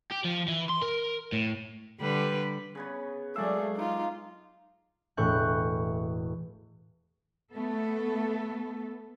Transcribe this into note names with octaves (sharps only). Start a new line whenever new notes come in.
G4
F3
E3
C6
A#4
A2
D3 G3 B4
C#3 B3 C#5
F#3 G#3 A3 G#4 D5 F5 E6
D#4 F4
E1 A2 C#6 F#6 G6
A3 B3 A4